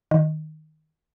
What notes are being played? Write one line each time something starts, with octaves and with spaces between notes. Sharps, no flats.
D#3